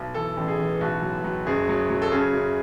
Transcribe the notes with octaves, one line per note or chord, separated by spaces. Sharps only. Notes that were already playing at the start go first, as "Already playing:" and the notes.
Already playing: B1
E3 A4
A1
G#4
E3
B1 F#4
F#3
F#3
F#1 G#4
F#3
F#3
A4
C#3 G#4
F#2